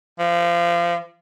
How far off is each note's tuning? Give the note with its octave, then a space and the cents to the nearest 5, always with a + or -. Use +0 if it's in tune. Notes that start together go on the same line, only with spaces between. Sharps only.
F3 -25